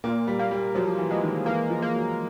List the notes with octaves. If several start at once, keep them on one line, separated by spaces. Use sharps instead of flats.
A#2 A#3
G3
A#3
G3
F3 F#3
E3
E3 G#3
D#3
E3 A#3
F3
A#3
F#3